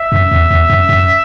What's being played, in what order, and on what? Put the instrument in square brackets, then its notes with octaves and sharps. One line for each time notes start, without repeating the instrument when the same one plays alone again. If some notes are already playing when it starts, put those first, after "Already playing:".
Already playing: [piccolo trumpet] E5
[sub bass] F#2
E2
E2
F#2
F#2